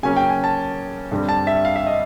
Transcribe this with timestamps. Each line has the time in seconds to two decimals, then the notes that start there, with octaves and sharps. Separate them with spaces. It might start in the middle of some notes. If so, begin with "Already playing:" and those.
0.03 C#3 F#3 A#3 C#4 G#5
0.16 G5
0.30 G#5
0.44 A5
1.11 G2 D3 G3 C4
1.29 A5
1.47 E5
1.65 F5
1.76 E5
1.87 D#5